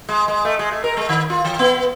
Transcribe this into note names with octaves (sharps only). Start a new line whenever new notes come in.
G#3
G#3
A3
G#3
A3
A#4
G#3
D#3
F4
E3
B3